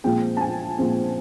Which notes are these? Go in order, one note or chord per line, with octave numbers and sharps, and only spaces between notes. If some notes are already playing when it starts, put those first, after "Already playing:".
A#2 F3 G#3 C4 G5
A5
G#5
A#2 F3 G#3 C4